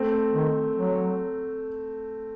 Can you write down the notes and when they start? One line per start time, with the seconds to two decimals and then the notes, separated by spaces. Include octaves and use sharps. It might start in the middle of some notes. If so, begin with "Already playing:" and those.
Already playing: A3 C4
0.34 D#3
0.76 F#3